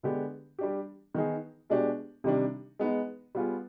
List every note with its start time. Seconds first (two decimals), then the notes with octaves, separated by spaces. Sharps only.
0.03 D3 G#3 B3 D4 G4
0.59 G3 D4 G4
1.15 D#3 B3 D#4 G#4
1.70 B2 G#3 D4 G4
2.24 C3 D#3 G3 D4
2.79 G#3 B3 D#4
3.35 G3 B3 F4 G#4